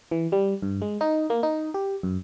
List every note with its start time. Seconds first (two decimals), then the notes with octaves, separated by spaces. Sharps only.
0.11 E3
0.32 G3
0.62 G2
0.82 G#3
1.01 D#4
1.30 A#3
1.43 D#4
1.74 G4
2.03 F#2